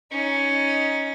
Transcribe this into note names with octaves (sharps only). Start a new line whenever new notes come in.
C#4 D#4